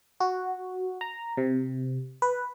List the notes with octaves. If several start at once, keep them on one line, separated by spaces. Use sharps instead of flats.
F#4
A#5
C3
B4